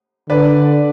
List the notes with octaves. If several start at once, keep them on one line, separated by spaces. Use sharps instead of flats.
D3 B4 D5